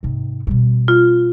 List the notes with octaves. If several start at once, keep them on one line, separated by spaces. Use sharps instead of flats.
G#2 C3
B2 G3
F4